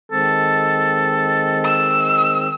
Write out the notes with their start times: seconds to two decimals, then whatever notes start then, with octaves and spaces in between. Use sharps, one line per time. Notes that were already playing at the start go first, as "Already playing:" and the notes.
0.12 D#3 G#3 C4 A4
1.65 E6